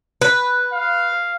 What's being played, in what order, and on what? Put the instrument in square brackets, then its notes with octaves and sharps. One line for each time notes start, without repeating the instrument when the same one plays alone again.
[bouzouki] B4
[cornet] F5